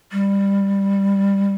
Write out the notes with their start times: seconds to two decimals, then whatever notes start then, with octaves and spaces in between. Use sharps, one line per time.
0.12 G3